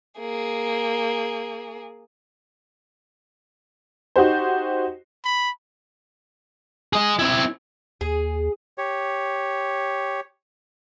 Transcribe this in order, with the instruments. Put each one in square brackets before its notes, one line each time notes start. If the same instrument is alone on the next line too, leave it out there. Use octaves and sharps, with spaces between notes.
[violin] A#3 G#4
[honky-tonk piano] D#4 F#4 G4 C5
[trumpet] B5
[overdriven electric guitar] G#4 D#5
C4 E4
[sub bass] D#2 [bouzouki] G#4
[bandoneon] G4 C#5